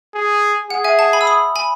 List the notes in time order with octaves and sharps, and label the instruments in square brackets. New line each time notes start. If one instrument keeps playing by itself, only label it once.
[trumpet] G#4
[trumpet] G#4 [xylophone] F#5
[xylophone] E5 G#5
F#5 A5
G#5 B5
E6
B5 D#6
G#5 B5